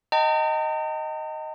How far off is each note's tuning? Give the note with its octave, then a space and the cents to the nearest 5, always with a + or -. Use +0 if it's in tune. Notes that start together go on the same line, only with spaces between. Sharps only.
D#5 +0 G5 -20 A#5 -45